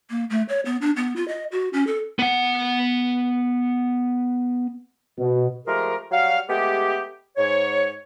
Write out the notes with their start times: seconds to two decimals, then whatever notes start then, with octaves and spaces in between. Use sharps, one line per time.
0.10 A#3
0.30 A3
0.49 C#5
0.65 B3
0.81 D4
0.97 B3
1.16 F4
1.28 D#5
1.52 F#4
1.73 C#4
1.87 A4
2.19 B3 F#5
5.18 B2
5.66 F3 G#3 A3 G4 G#4 A#4
6.11 F#3 G3 F#4 F5
6.48 G#3 A3 B3 G4
7.36 G#2 C#5